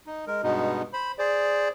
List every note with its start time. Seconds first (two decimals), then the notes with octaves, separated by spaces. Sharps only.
0.07 D#4
0.27 G#3 A#4
0.43 G2 B2 G#3 B3 D#4
0.93 C5 B5
1.19 G#4 C5 D5